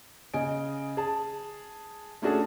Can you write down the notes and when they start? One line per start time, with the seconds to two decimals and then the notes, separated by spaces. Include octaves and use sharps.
0.34 C#3 D#5 G#5 D7
0.97 G#4 A5
2.22 A3 C#4 D4 F#4 G#4 A4